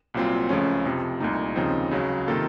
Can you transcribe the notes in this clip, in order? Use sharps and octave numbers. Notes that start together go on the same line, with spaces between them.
C2 A#2 F#3 C4 F4
C#2 C#3 F3 A3 C#4
F2 C3 F3
C2 A#2 A3 D#4
D#2 C#3 F3 C4 D#4
C#2 C#3 F#3
C3 D#3 A#3 F4 A4